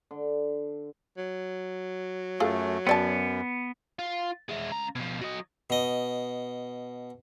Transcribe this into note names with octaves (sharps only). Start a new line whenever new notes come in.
D3
F#3
F#2 A3 F4 G#4 A4
F#2 B3 C4 D5 A5
F4
G#3 E4
C#2 A#5
B2 F3
F#3 D#5
B2 D#5